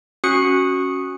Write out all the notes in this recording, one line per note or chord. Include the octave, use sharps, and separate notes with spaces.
C#4 F#4 D#6 F#6 C#7